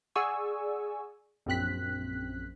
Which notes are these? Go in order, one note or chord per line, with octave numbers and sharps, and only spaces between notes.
G#4 D5 F#5 G#5 C#6 E6
A#1 F#2 C4 F#6 B6